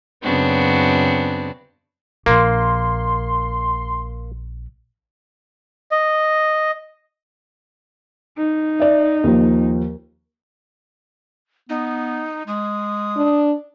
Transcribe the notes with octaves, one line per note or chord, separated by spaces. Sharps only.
F#2 C#3 B3 C4 D4 F#4
A#1 A#3 C6
D#5
D#4
D5 E5
D#2 F3
B3 D#4
G#3 D#6
D4